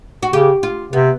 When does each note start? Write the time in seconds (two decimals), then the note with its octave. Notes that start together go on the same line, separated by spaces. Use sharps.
0.22 F#4
0.33 C#3 G4
0.63 F4
0.93 C3 B3